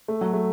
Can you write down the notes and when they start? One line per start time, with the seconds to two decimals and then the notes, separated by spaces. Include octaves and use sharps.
0.08 A3
0.21 F#3
0.34 A3